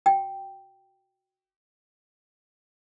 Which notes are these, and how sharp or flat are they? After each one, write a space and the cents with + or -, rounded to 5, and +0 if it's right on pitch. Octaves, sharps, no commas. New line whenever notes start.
F#4 +0 G5 -5